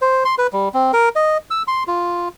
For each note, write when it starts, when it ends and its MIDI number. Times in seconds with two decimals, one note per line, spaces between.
0.02 0.24 72
0.25 0.35 84
0.38 0.47 71
0.53 0.69 55
0.74 0.92 60
0.93 1.09 70
1.16 1.38 75
1.50 1.63 88
1.68 1.84 84
1.87 2.28 65